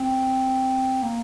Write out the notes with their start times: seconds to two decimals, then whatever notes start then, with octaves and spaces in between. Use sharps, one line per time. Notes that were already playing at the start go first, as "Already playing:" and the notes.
Already playing: C4
1.02 A#3